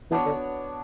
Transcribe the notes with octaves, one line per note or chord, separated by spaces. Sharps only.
E3 B3 D4 F#4 C#5
D3